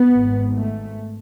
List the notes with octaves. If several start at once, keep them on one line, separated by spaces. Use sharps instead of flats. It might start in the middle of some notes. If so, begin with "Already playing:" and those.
Already playing: B3
G#1 G#2
A3